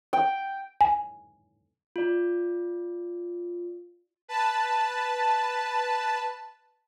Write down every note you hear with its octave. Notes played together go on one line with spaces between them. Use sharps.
G5
G#5
F4 D5
B4 A5